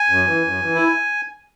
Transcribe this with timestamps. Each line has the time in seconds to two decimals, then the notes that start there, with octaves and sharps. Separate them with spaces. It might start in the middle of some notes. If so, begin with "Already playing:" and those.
Already playing: G#5
0.09 F#2
0.27 E3
0.44 F#2
0.62 E3
0.75 E4